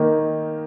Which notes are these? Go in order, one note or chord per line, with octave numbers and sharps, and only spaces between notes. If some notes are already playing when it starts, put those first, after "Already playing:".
Already playing: D#3 A#3 D#4